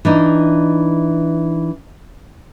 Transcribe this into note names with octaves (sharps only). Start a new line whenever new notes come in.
E3 D4 D#4